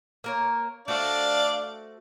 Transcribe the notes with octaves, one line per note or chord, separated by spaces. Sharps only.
A#3 A#4 C#5
A3 D4 F#4 C5 D5 F5